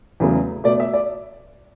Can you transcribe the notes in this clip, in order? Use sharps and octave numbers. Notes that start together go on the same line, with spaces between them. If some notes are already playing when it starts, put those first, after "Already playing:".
E2 C#3 F#3 A3
B2 A3 D5
E5
D5